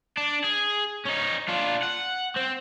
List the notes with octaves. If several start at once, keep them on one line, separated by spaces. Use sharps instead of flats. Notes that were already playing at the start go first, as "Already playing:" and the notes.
D4
G#4
C#4 D#4
D4 F4
F#5
C4